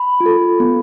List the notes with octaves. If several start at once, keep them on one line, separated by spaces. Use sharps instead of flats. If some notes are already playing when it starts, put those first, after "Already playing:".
Already playing: B5
F4
A4
B3